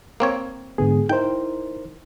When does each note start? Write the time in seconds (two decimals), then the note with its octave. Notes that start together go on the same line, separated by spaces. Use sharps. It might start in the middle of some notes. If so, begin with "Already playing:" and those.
0.20 A#3 C4 C#5
0.78 G#2 D3 B3 G#4
1.09 D#4 E4 A#4 C5 G5